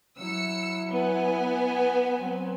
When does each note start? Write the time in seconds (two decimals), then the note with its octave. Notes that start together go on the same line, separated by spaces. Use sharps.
0.17 F#3 E4 E6 C#7
0.90 B3 G#5
2.19 F#3 C4